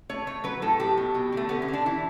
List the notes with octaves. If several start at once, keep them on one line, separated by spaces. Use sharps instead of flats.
A3 C#5
A3 C#5
F#3 B4
A2 A4
F#3 G4
B2
B2
D3 A3
D3 B3
C#4
D3
D4
E3 E4